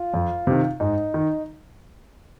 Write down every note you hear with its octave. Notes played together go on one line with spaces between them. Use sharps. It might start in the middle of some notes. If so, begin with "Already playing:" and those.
Already playing: F4
F2
C3 D#3
G#2 D#4
D#3